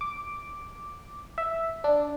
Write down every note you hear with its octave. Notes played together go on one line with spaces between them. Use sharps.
D6
E5
D4